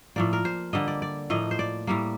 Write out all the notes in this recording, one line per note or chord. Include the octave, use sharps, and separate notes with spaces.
A2 F3 A#3 D5
A#4
C5
D3 G3 A#3 D#5
D5
D5
A2 F3 A#3 D#5
C5
D5
A2 G3 A#3